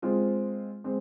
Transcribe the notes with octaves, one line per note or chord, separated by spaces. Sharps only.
G#3 C4 F4
G#3 C4